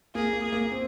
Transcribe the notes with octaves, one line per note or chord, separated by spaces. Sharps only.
A#3 G#4
A#3
G#4
A#3
C4